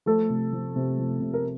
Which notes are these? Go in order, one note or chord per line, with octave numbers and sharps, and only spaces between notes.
F3 A3 A4
C3
F3
C3
F3
C3
A#4